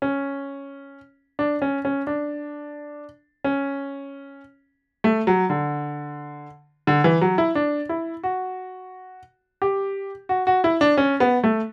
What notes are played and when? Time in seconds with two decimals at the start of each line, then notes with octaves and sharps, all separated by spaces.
0.02 C#4
1.39 D4
1.62 C#4
1.85 C#4
2.07 D4
3.44 C#4
5.04 A3
5.27 F#3
5.50 D3
6.87 D3
7.04 E3
7.21 F#3
7.38 E4
7.55 D4
7.89 E4
8.23 F#4
9.62 G4
10.29 F#4
10.47 F#4
10.64 E4
10.81 D4
10.97 C#4
11.20 B3
11.44 A3